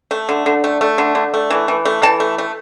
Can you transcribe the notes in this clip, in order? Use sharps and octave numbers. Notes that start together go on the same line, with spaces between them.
A3
D3
D3
A3
A3
D3
D3
A3
E3
E3
A3
E3 A5
A3
A3